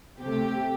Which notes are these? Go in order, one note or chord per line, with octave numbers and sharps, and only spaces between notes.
C3 A3 G4